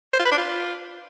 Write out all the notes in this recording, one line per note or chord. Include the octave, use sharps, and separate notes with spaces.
C5
F4
B4
D4
F4